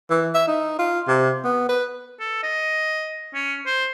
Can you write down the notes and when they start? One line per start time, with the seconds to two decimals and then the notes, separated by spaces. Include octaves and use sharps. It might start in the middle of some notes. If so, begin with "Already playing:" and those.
0.10 E3
0.34 E5
0.48 D#4
0.79 F4
1.07 C3
1.44 B3
1.69 B4
2.20 A4
2.43 D#5
3.34 C#4
3.66 C5